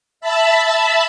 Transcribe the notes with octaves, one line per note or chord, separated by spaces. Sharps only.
E5 A5 B5